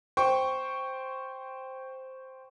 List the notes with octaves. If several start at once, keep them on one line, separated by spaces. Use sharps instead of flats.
C5 G5 C#6